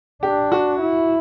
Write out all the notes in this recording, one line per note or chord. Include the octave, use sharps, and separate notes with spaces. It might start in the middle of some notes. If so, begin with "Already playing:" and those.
D4 G4
F#4
E4